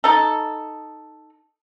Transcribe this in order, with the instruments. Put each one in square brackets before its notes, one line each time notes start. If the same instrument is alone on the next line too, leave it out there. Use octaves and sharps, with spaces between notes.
[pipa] D#4 A4